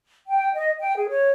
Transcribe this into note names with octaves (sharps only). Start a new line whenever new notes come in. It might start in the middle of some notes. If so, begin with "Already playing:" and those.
G5
D#5
G5
G#4
C#5